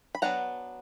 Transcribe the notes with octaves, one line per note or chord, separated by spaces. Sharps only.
B5
F#3 B3 D4 F#5 A#5